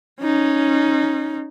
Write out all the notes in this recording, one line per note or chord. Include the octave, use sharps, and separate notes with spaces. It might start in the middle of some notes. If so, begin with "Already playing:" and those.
C#4 D#4